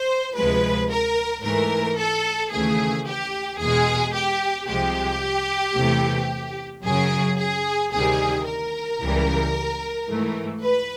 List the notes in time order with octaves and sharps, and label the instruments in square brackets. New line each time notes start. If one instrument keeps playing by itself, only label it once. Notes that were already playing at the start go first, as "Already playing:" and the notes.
Already playing: [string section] C5
D2 C3 F3 G#3 B4
A#4
G#2 E3 A3 A#4
A4
D#2 C#3 E3 A3 G#4
G4
E2 B2 G#3 G#4
G4
C2 C3 F3 G#3 G4
E2 C3 E3 A3
F#2 C#3 F#3 G#4
G#4
D2 C3 D#3 G3 G#4
A#4
C#2 C#3 E3 G3
G#2 E3 A3
B4